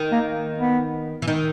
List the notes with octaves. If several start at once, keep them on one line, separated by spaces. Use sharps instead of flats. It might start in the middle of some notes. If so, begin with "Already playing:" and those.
Already playing: D#3
A#3
B3
E3
D#3 D#4